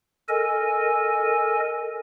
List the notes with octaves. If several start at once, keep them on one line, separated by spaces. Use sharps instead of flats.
A4 A#4 D#5 G#5